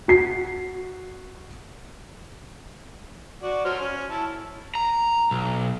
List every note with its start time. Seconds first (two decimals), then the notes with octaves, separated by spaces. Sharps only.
0.08 F#4 C7
3.43 F#4 D5
3.65 F#3 C5 F6
3.80 C#4
4.10 E4 A5
4.75 A#5
5.31 B1